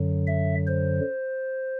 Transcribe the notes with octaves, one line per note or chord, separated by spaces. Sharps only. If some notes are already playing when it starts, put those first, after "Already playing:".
Already playing: F#2 D3 F#3
E5
C5